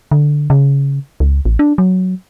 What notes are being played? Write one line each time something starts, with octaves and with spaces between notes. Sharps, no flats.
D3
C#3
C#2
A1
D4
F#3